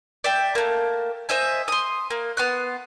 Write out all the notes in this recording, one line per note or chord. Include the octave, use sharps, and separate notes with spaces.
D5 E5 G5
A3 A#3
C5 D#5 E5 G#5
C6 D#6
A#3
B3 C6 F#6